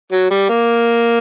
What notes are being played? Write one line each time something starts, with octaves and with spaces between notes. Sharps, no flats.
F#3
G3
A#3